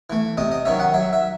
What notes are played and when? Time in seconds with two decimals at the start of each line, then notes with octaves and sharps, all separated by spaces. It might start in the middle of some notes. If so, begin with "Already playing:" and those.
0.10 E3 A3
0.38 C3 D#5
0.52 D#5
0.65 D#3 F#3 C#4 E5
0.80 F#5
0.94 F#3 E5
1.13 E5